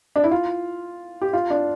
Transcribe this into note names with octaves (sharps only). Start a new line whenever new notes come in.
D4
E4
F4
G4
F4
D4